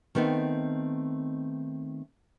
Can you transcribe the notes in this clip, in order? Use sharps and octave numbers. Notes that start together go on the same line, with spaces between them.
D#3 A3 B3 C4 D#4